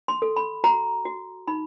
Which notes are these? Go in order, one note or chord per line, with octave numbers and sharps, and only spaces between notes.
C6
A4
B5
F#4 A#5
F#4
D#4 B5